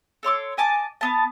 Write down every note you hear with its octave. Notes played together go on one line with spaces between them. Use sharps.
A4 C#5 C6 D6
D#5 G#5 A5 D6
B3 A5